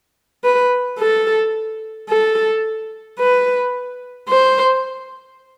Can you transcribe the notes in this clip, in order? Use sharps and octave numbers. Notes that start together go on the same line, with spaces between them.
B4
A4
A4
B4
C5